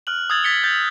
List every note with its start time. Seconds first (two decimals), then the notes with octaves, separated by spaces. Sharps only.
0.07 F6 F#6 F#7
0.30 D#6 E6 G#6 A6 F#7
0.44 G#6 A6 B6 C#7 G7
0.64 G6 A6